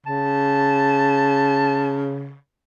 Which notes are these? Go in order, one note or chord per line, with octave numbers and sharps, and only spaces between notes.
C#3 A5